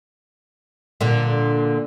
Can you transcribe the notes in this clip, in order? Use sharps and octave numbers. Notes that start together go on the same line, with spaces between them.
A#2 D3